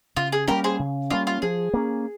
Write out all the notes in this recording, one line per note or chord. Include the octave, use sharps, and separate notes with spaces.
C#3 F4
G#4
G3 A#3 C#4 G4 A#4
G#4 C5
C#3
G3 A#3 C#4 F4
F4
F3 G#4
A#3 C#4